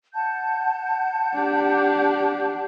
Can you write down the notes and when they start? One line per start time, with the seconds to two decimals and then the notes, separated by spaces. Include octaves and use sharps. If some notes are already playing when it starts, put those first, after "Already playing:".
0.14 F#5 A5 G6
1.35 D4 G4